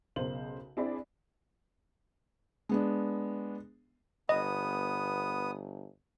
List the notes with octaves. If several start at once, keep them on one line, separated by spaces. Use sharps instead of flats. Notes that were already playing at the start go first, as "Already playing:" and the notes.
B1 C#3 B3 A#4 C5 F#7
C4 D4 E4 G#4 D5 B5
G#3 B3 D4
G1 B3 D#5 D#6